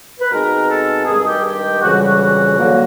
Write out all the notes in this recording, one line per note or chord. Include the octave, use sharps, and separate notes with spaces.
B4
B2 G#3 C4 D#4 A#4
A4
G2 D#3 G#3 G#4
G4
G4
F2 C#3 E3 G3 F#4
F#4
D3 F#3 A#3